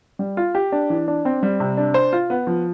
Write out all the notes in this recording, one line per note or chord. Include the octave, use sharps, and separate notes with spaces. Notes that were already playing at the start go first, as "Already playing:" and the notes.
G3
F4
G4
D4
E3
D4
C4
G3
C3
D4
C5
F4
B3
F3